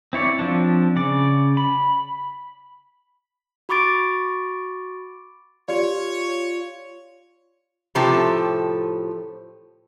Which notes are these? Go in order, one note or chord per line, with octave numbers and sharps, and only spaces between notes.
C4 E4 C#5 D5
F3 C4 D4
C#3 D5
B5
F#4 B5 C#6 D6 A6 D7
F4 G4 C#5 D5
A2 C3 F3 G4 A4